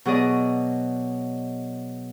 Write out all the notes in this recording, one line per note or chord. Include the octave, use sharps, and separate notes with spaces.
B2 F#3 G#4 D5 D#5